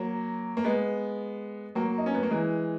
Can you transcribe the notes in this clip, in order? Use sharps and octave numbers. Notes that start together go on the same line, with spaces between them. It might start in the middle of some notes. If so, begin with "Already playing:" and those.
Already playing: F#3 A#3
A#3
G#3 B3
F#3 A#3
D#4
C#4
B3
A#3
E3 G#3